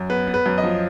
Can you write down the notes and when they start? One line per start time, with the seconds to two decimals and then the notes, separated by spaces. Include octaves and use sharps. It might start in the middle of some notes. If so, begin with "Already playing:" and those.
Already playing: F#2
0.10 B3 B4
0.27 B3
0.34 B4
0.46 F#2
0.58 D#5
0.63 F3